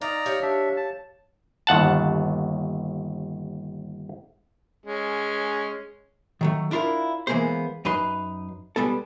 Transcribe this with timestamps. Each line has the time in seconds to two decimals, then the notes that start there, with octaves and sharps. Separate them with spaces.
0.02 D#4 D5 F5 A#5
0.26 G4 C#5 F5
0.42 D4 E5
0.77 A5
1.67 G1 D#2 F#5 A5
4.85 G#3 C#4
6.41 D#3 F#3 A3
6.71 D4 E4 F4 G4 A#4
7.27 E3 G#3 A#3 B3 G#4 C5
7.85 F#2 D#4 B4 C6
8.76 G3 G#3 B3 A4